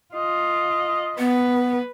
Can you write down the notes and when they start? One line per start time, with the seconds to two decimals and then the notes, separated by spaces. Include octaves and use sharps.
0.14 F4 D#5
1.18 B3 B4